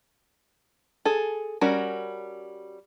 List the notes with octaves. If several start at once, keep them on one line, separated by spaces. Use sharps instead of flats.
G#4 A4
G3 C#4 F#4 A#4